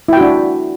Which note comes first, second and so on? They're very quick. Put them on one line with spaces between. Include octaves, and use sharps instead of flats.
E4 G5 F#4 D4